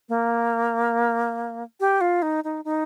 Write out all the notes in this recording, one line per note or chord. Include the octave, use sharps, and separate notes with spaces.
A#3
G4
F4
D#4
D#4
D#4